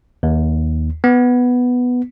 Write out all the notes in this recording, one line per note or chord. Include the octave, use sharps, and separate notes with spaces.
D#2
B3